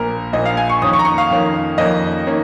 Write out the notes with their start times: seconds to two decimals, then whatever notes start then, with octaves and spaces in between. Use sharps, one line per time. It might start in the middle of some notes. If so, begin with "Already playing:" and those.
Already playing: A#1 A#2 A#3 A#4
0.33 A#1 A#2 A#3 D#5
0.45 F5
0.57 G#5
0.69 C#6
0.82 F2 D#3 A#3 C#4 D#6
0.93 C#6
0.99 A#5
1.05 C#6
1.18 F5
1.30 F2 D#3 A#3 C#4
1.78 F2 D#3 A#3 C#4 D#5
2.27 D#3 A#3 C#4